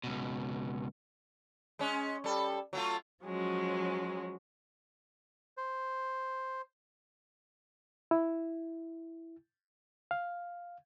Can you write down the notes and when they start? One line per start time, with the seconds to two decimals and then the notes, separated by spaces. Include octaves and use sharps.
0.04 C#2 B2
1.79 G#3 C#4
2.24 G3 A4
2.73 F#3 A3 F4
3.23 F3 F#3 G#3 C#4
5.57 C5
8.11 E4
10.11 F5